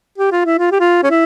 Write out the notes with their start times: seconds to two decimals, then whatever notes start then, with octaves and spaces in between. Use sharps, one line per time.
0.18 G4
0.32 F4
0.45 E4
0.59 F4
0.72 G4
0.80 F4
1.04 C#4
1.10 E4